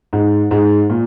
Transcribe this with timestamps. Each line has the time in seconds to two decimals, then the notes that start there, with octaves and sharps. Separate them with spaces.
0.13 G#2
0.51 G#2
0.90 A#2